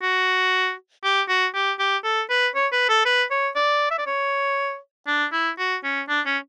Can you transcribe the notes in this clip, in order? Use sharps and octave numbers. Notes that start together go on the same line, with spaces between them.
F#4
G4
F#4
G4
G4
A4
B4
C#5
B4
A4
B4
C#5
D5
E5
D5
C#5
D4
E4
F#4
C#4
D4
C#4